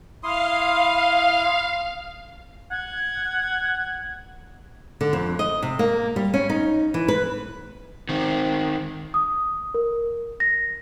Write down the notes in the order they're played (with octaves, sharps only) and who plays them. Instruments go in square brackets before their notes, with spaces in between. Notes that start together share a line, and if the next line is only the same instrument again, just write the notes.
[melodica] E4 C6 D#6 [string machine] F5
[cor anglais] F#5 [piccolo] G#6
[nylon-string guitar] D3
F2
D#5
C3
A#3
G3
C#4
D#4
E3
B4
[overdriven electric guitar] D#3 C4
[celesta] D#6
A#4
A#6